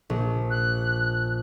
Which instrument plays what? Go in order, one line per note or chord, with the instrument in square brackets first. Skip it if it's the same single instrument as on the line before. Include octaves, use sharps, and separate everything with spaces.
[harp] A#1
[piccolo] F#6